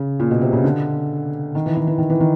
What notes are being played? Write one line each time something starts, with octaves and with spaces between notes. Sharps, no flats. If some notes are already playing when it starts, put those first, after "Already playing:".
Already playing: C#3
A#2
B2
C3
C#3
D3
D#3
E3
D#3
E3
D#3
E3
D#3